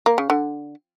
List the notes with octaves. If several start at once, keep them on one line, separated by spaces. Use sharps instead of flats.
A#3
C#3
D3